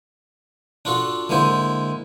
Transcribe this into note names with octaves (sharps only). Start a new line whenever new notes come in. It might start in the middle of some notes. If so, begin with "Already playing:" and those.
D4 F4 F#4 A4
D3 G#3 A#3 E4 C5